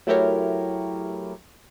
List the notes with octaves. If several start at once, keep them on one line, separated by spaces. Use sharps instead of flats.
F#3 A3 E4 G4 A#4 C#5